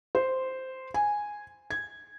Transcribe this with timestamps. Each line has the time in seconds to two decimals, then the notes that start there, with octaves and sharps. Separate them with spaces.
0.15 C5
0.94 G#5
1.70 G#6